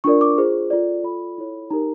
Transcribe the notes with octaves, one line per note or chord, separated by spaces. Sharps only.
D4 F4 A#4 D5 C#6
D6
F4 G#4 C5
F4 A4 D5
F4 A4 D5 B5
E4 A4 C#5
D#4 G4 A#4 A#5